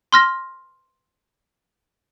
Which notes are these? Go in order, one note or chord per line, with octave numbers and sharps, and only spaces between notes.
C6 F6 A#6